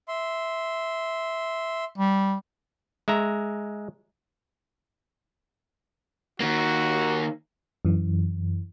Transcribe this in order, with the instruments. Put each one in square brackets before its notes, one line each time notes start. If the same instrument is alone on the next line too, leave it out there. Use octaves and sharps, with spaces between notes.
[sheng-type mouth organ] E5 C6
[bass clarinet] G3
[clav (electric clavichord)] G#3 E5 A#5
[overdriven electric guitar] D#3 A#3 [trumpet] F#4
[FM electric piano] F#2 E3